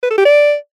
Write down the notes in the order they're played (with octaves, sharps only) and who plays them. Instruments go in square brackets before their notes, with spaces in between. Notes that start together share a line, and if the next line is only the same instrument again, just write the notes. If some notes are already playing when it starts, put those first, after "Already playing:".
[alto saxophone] B4
A4
G4
D5